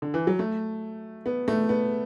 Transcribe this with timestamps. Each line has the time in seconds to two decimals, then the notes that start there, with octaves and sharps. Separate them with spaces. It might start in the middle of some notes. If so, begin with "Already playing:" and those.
0.02 D3
0.14 E3
0.27 F#3
0.39 A3
1.26 B3
1.48 A3
1.69 B3